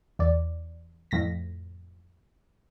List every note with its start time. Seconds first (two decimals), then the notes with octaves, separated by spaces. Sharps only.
0.19 E2 D5
1.11 F2 A2 A#6 B6